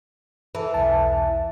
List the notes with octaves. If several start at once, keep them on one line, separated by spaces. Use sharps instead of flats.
E3 A4 B4
B1 E2 A5